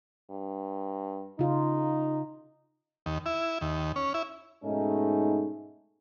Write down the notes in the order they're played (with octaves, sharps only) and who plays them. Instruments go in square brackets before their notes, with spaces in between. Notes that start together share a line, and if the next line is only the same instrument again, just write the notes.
[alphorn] G2
[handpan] C#3 F4 [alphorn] D#4
[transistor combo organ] D#2
E4
D#2
C#4
E4
[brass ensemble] G#2 B2 A3 C#4 D#4